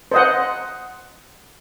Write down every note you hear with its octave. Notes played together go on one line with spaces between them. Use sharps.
C5 D#5 F#5